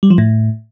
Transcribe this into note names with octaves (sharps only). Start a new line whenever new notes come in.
G3
F3
A2